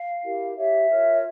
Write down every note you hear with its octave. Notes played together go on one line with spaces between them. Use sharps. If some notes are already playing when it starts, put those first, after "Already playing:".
Already playing: F5
E4 G4 A#4
G4 C#5 E5
F4 A#4 C#5